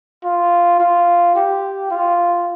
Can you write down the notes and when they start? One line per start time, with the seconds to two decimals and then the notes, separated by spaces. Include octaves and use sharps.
0.24 F4
0.80 F4
1.36 G4
1.91 F4